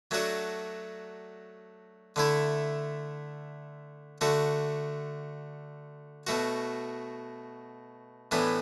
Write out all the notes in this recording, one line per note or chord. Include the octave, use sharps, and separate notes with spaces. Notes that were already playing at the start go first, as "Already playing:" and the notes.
F#3 A3 D4 F#4
D3 A3 E4
D3 A3 F#4
B2 A3 F#4
A2 E3 B3 D4